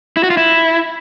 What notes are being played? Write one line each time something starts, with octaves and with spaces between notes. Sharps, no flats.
E4
F#4
F4
E4